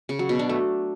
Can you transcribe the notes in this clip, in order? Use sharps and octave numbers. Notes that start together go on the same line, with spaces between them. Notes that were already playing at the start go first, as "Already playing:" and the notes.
C#3
F#3
B2
D4
A3